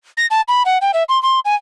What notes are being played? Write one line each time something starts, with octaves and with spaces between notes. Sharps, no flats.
A#6
A5
B5
F#5
G5
E5
C6
C6
G#5